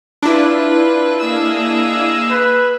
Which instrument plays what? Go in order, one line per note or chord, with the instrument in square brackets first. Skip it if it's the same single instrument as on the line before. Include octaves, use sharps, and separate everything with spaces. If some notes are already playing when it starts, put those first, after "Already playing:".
[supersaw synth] D4 E4 [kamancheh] F4 B4
[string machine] A#3 D#5 F5 [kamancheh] G#4 E6
[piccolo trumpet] B4